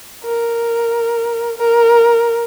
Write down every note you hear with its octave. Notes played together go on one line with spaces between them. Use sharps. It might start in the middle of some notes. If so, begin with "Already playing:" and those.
A#4
A#4